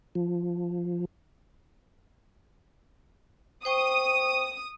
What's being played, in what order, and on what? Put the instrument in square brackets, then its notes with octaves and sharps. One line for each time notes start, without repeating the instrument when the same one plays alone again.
[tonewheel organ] F3
[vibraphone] C5 G5 C#6 [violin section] D#6